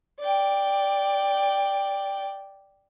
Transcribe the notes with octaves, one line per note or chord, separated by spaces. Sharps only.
D5 G5